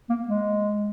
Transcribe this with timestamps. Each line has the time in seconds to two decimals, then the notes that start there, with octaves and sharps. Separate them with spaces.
0.09 A#3
0.28 G#3